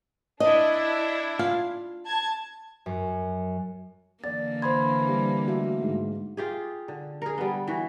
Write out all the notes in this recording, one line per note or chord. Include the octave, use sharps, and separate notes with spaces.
D4 E4 D#5
F4 F5
A5 G#6
F#2
D3 E3 A#3 D5 A6
C5 B5 C6 G#6
G3
A3 F#4 E5
G#2
F4 G4 G#4
D3
G#4 A#4
G3 B3
E3 F#4